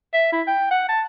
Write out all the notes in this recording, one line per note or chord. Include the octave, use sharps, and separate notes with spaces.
E5
E4
G5
F#5
A5